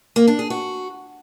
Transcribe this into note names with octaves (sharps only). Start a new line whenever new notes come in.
A#3
D4
G#4
F#4